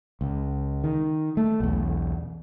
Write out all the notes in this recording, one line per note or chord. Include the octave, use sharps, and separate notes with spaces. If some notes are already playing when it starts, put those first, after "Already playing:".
C#2
D#3
A3
B1 E2